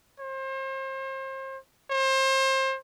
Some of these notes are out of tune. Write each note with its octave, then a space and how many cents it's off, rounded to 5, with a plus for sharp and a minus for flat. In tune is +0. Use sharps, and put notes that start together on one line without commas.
C5 +35
C5 +30